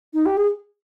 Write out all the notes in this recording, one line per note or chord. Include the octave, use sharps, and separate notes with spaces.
D#4
G4
G#4